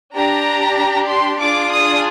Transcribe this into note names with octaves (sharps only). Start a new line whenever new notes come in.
D4 G4 A#5
C6
D4 F4 G#4 D6
D#6